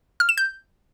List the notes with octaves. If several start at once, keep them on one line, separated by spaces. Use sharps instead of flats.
F6
E7
G6